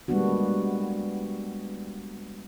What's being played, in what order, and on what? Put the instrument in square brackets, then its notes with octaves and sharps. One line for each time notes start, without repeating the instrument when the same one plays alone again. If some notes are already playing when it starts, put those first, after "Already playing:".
[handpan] G3 G#3 A#3 B3 D4 F#4